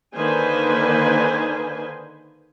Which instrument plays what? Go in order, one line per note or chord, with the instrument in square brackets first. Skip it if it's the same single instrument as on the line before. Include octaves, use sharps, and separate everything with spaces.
[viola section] D3 D#3 A#3 B4 C5 G#5